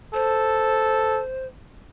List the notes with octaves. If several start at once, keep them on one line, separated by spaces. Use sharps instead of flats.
A4 C5